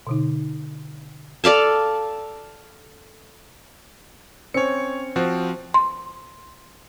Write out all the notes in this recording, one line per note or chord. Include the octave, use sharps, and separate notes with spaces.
B2 D3 D#4
A4 D5 F5 A5
C4 C#4 C#5 C#7
F3 C4 F#4 C5
C6